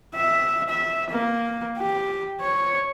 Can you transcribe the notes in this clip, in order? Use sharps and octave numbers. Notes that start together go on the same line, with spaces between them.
E5
E5
A#3
G4
C#5